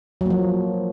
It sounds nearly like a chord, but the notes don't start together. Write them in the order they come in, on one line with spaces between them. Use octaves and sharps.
F#3 A#3 F3